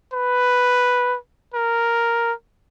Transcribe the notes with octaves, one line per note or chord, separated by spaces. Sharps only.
B4
A#4